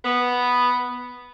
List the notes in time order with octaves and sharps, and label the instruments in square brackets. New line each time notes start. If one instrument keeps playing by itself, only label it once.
[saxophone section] B3